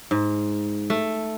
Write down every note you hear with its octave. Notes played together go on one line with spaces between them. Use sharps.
G#2
A3